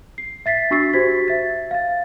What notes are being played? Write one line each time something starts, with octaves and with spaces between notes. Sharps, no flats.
C7
E5 A6 B6 C7
D4 F#4 C#6 E6 A6 C7
F#4 G4 C5 G#6 B6
E5 A6
F5 A6